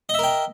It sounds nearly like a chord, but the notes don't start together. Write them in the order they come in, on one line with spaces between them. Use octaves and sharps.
D#5 E5 A#4 G5